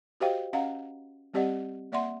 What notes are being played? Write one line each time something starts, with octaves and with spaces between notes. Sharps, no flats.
F#4 G4 C5 D#5 F5 G5
C#4 D#5 F5 F#5 A#5
G3 C4 G4 D5 D#5 F#5
A#3 D5 E5 F#5 C6